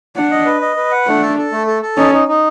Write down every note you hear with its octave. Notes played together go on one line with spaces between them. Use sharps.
D4 F#5
D#5
B4
D#5
B4
F#5
A3 D4
A4
A4
A3
A4
A4
C#4 D#4
D#4
D#4